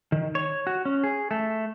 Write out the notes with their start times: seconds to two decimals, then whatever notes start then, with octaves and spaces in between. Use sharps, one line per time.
0.12 D#3
0.35 C#5
0.67 F#4
0.85 C#4
1.04 G#4
1.31 A3